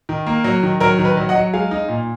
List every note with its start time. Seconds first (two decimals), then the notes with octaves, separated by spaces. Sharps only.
0.09 D#3
0.27 A#3
0.44 F#3
0.63 D#3
0.80 F#3 A#4
0.99 D#3
1.05 B4
1.17 F#3
1.29 D#5 F#5
1.35 F#3
1.53 G#3 F5 G#5
1.71 D#4
1.89 A#2